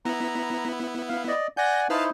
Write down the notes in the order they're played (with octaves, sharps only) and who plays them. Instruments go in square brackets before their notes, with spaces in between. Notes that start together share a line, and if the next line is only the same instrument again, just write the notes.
[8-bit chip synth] B3 E4 [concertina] A#5
[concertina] F5
D5 D#5
[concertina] D5 F#5 G#5 [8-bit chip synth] G6 A#6
[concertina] D#4 E4 C5 [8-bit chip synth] B4 F5 A5